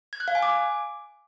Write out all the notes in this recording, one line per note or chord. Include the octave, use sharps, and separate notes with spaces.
G#6
F#6
F5
G#5
D6